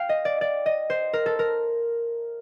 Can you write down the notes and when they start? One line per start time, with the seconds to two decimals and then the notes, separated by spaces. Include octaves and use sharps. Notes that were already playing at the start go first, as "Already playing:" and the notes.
Already playing: F5 G5
0.09 D#5
0.25 D5
0.41 D5
0.66 D#5
0.90 C5
1.13 A#4
1.26 A4
1.39 A#4